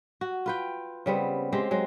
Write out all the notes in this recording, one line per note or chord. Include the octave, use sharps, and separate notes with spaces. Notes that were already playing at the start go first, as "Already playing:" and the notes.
F#4
F4 B4 G5
C#3 G3 B3 C4
G#3 C4 G4
F#3 G#3